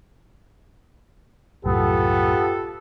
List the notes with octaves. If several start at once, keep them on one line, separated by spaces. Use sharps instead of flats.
C2 F#2 A2 B3 F4 G4 A4